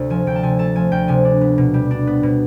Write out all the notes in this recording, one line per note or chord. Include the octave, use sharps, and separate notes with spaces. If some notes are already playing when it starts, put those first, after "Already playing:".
Already playing: D2 C3 A3
F3 G#5
D2 G5
A5
C3 G#5
A3 A5
F3 G#5
D2 G5
C3 G#5
D4
B3
B2
G3
D4
B3
B2